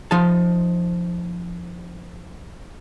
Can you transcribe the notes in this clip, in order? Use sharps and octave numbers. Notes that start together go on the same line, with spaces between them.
F3 D#4 A5